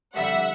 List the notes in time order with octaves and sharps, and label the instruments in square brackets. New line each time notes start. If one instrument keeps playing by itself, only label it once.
[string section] F2 D3 G3 E5 F#5